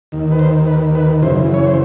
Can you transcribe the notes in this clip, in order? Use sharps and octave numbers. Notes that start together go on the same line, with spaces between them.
D#2 D#3
B4
C5
B4
B4
F#2 C#3 E3 C5
C#5
C5